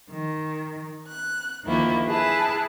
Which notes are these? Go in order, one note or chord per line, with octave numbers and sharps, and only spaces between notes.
D#3
F#6
D2 D#3 F3 A#3 E4
E4 G#4 B4 A5 B5